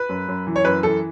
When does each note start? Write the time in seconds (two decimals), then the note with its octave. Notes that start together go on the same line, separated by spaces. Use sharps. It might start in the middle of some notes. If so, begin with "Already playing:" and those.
Already playing: B4
0.09 F#2
0.28 F#2
0.47 E3
0.56 C#5
0.65 F#2 B4
0.83 E3 A4